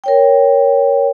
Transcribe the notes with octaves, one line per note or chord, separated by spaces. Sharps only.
A#4 C#5 G5